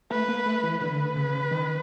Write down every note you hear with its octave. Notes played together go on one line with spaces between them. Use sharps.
A3 B4
A#3
A3
E3
D3 B4
C#3
D#3